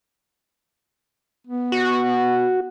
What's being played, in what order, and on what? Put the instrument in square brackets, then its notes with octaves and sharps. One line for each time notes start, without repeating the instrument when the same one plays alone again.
[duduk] B3
[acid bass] F#4